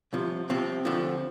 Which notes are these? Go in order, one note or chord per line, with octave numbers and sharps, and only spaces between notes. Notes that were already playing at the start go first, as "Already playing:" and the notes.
C2 C3 F3
C2 C3 F3 C4
D2 D3 F3